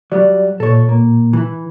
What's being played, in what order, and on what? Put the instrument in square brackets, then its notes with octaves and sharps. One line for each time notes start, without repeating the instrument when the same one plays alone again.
[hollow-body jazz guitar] F#3 G3 [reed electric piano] D5
[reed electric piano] A#2 [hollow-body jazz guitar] A4 C#5
[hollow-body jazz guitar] A#3
E3 E4